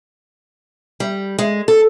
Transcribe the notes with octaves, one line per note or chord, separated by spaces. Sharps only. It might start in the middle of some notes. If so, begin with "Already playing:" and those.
G3
G#3
A4